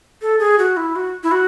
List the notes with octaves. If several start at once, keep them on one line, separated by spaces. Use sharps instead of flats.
A4
G#4
F#4
E4
F#4
E4
F#4